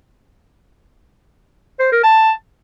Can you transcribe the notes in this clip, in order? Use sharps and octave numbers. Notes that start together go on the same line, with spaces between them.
C5
A#4
A5